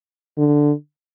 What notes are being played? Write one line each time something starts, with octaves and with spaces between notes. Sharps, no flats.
D3